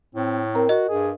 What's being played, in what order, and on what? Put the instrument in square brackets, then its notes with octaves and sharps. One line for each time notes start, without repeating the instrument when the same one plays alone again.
[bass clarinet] A2 [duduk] C4
[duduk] C4 [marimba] A#4 A#5
[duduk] F#4 [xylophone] D#5
[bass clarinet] G2 [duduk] G#4